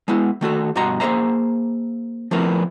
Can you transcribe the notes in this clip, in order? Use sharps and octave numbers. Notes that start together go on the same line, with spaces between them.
G#3 B3 E4
D#3 A3 F#4 A4
G2 B2 F#4 D#5 A#5 C6
A#3 G#4 B4 C5 E5 A#5
F3 A3 B3 C4 E4 A#4